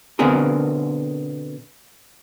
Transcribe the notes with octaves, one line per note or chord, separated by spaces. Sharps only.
B2 D3 B3 C4 G#4 A#4